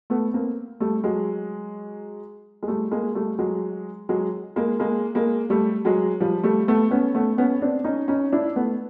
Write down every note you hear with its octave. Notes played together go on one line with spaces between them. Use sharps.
A3 B3
A#3 C4
G3 A3
F#3 G#3
G#3
G3 A3
G#3 A#3
G3 A3
F#3 G#3
F#3 G#3
G#3 A#3
G#3 A#3
G#3 A#3
G3 A3
F#3 G#3
F3 G3
G3 A3
A3 B3
B3 C#4
A3 B3
B3 C#4
C4 D4
C#4 D#4
C#4 D#4
D4 E4
A3 B3